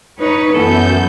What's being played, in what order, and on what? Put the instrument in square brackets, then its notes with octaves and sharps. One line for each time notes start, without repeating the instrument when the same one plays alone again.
[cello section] D#4 B4 C#5
[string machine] F#2 G6 [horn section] E3 A4 [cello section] B3